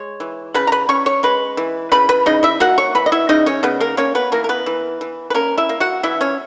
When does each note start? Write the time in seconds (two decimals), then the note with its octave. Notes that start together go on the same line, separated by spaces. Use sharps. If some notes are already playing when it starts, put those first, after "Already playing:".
Already playing: G#3 C#5
0.20 E3
0.54 C#3 B4 B5
0.67 A#5
0.72 B4 B5
0.89 C#4 C#5 C#6
1.06 C#5 C#6
1.23 G#3 B4 B5
1.57 E3
1.92 C#3 B4 B5
2.09 B4 B5
2.26 C#3 D#4 D#5
2.43 E4 E5
2.60 A#3 F#4 F#5
2.78 C#5 C#6
2.95 E3 B4 B5
3.06 D#5
3.12 E4 E5
3.29 C#3 D#4 D#5
3.46 C#4 C#5
3.63 C#3 B3 B4
3.81 A#3 A#4
3.97 A#3 C#4 C#5
4.15 B3 B4
4.32 E3 A#3 A#4
4.44 A#4
4.49 B3 B4
4.66 E3
5.01 E3
5.30 B4
5.34 A#3 C#4 A#4
5.58 E4 E5
5.69 A#3
5.80 F#4 F#5
6.03 E3 E4 E5
6.21 C#4 C#5